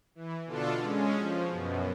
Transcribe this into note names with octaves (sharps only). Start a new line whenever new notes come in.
E3
B2 D3 D4 F4 A4
G#3 C#4
F3
F#2 B2